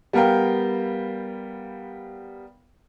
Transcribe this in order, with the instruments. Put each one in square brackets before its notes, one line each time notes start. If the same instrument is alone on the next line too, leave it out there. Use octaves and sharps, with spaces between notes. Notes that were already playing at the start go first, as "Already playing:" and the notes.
[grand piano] G3 B3 A#4 F5 G5